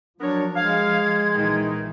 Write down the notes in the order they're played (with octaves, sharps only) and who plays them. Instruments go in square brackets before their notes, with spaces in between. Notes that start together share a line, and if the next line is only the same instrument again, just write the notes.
[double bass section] F3 [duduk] F#3 [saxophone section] B3 A#4 C#5 [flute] D4
[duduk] G#3 [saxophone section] F5 [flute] G#6
[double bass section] A#1 A#2 E3 [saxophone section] D#3